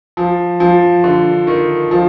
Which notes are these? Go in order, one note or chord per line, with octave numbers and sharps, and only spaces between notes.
F3
F3
D3
D#3
F3